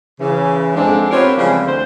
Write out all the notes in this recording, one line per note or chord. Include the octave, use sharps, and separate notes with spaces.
C#3 E3
F2 G#2 G#3 C4 D4
B3 C4 F4 G4 A#4 C#5
C#3 E3 F3 G3 G#3 C4
D2 C5